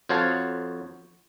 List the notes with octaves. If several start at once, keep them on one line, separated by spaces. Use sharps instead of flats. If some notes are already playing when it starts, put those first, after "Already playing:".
F2 F#4 C5 C#5 F5 A5